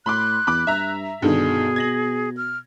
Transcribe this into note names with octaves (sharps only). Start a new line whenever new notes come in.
A2 B5 C6 D6 F#6
E2 B5 D6
G2 E5 A#5
G2 B2 D3 D#3 G#4
G#6 A#6 F#7
F6